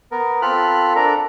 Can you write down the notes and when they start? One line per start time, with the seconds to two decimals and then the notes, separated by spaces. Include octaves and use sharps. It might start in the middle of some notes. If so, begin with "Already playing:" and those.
0.11 B3 A#4
0.42 C4 F4 A4 B5 F6 F#6
0.96 D4 A4 A#4 A#5